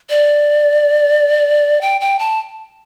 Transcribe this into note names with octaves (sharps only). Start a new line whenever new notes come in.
D5
G5
G5
A5